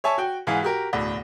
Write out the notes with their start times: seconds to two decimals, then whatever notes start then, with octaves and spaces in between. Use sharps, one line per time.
0.04 C#5 E5 G#5 A5 C#6
0.18 F#4 G5
0.47 G#2 E3 F5 F#5 G#5
0.63 F#4 G4 A#4
0.93 E1 D2 A2